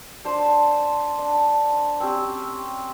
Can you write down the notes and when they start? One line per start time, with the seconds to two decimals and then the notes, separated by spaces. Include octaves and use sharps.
0.25 D4 C5 D5
1.18 D4
2.00 C4 C#4 G4